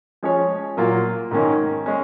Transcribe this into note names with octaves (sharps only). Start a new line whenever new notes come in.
F3 G#3 C#4 G#4 C#5
A#2 F#3 A#3 F4
G#2 D#3 A#3 C#4
G#3 C#4